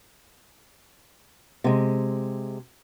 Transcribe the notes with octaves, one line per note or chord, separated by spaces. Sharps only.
C3 G#3